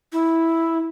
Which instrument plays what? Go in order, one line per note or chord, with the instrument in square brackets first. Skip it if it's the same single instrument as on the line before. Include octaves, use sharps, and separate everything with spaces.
[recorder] E4